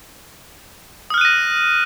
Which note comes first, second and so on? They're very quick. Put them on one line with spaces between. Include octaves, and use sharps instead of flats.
D#6 F6 F#6 D#7 A#6